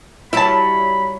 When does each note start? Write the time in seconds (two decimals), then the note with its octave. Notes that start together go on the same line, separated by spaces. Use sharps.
0.33 F#3 G3 E4 E5 A5 B5